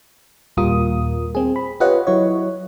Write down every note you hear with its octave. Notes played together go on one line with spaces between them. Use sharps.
D#2 A#2 G3 F4 A#4 D#6
C4 G#4
B5
F4 G4 B4 C#5 D#5 F#5
F#3 E4 C#5